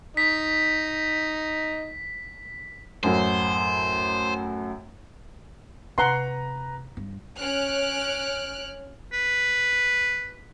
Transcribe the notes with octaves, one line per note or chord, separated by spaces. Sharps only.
D#4 B6
F#2 A2 F#3 C5
C3 B4 F#5 A#5 C6
G2
C#4 F6 F#6 D7
B4